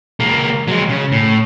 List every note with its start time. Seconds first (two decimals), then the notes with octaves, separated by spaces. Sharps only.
0.20 C#2 A#3
0.68 F#3 G#3
0.89 C#3
1.12 A2